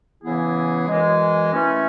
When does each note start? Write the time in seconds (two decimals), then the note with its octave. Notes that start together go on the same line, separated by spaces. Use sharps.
0.23 C#3 E3 B3 E4 G#4
0.88 F#2 E3 G#3
1.53 E3 A3 C#4